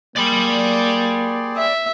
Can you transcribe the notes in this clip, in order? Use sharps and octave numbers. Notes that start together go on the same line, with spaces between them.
A#3 G4 G#4 D5 B5 C6
E5